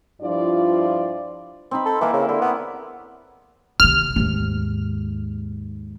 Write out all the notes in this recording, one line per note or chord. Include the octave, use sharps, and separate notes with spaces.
G2 F3 E4 F4 D5
C4 D#4 B5
A4
E3 A#3 E4
C#3
D3 E4
B3
D#2 C3 F6
D#2 G#2